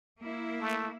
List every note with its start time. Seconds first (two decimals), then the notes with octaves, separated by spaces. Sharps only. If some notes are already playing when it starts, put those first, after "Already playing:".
0.20 A#3 E4
0.61 A3